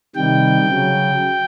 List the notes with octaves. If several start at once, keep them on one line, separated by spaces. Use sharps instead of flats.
C3 D#3 G3 G5
C#3 F#3